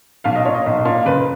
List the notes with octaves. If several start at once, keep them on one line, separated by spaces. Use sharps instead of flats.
B1 F5
D#5
A#2 C#5
D#5
B1
A#2
F#1 B4